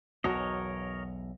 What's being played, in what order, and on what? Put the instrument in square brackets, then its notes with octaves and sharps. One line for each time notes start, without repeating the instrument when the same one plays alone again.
[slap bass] B1 E2 [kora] F#4 [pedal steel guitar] A#4 C#5 D#5